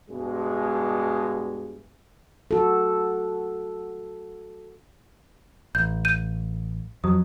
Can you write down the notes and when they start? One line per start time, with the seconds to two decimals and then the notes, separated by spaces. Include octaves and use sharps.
0.10 G2 B2 G#3
2.51 F#4 A4
5.75 A1 G6
6.05 G6 D#7
7.04 F2 F#3 D#6